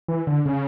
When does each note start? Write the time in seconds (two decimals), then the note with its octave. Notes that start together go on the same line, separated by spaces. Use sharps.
0.08 E3
0.27 D3
0.46 C#3